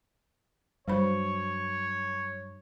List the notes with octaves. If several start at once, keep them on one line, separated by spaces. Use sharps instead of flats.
G2 F#3 G3 C5 C#5 B5